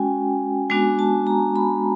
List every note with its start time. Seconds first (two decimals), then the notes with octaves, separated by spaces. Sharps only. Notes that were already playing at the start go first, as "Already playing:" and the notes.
Already playing: G#3 C#4 F#4 G5 G#5
0.70 G#3 B3 D4 F#4 G#5
0.99 A5
1.27 A#5
1.56 B5